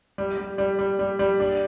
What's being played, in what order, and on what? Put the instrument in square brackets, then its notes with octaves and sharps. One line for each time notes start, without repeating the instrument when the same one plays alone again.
[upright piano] G3
G3
G3
G3
G3
G3
D4